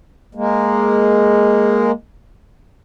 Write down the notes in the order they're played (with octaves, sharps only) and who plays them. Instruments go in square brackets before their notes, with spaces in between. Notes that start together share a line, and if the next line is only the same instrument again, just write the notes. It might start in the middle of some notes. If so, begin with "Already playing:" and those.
[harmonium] G#3 A#3